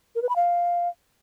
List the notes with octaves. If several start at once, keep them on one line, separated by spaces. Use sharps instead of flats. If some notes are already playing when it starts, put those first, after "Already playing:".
A#4
B4
B5
F5